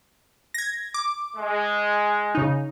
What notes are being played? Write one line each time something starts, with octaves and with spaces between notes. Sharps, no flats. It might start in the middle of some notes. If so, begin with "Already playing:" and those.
G#6 A#6
D6
G#3
C#3 D#4